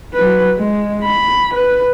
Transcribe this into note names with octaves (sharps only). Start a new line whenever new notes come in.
F#3 B4
G#3
B5
B4